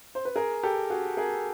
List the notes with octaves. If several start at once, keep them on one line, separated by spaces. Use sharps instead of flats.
C5
B4
G#4 A#4
G4 A4
F#4 G#4
G#4 A#4